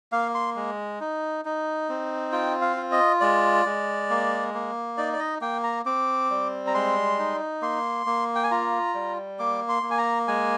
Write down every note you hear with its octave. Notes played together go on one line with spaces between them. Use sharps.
A#3 F5
C6
G#3
D#4
D#4
C4
F4 G5
F5
F4
D#5
G#3 D5
G#3
A#3
A#3
D#4 D5
D5
D#5
A#3 G5
A#5
C4 D6
G3
A#5
G#3 C6
D#4
A#3 C6
A#3
G5
G#5
F4 A#5
G3
A#3 D6
C6
A#3
G#5
A#5
G#3 G#5